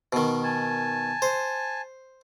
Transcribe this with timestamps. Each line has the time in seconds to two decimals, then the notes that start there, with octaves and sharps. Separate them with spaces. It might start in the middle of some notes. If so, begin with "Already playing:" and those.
0.13 B2 D#3
0.44 G#5 A5
1.22 C5